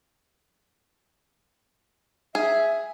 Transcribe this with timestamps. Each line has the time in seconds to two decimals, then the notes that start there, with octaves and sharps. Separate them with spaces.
2.35 G#4 E5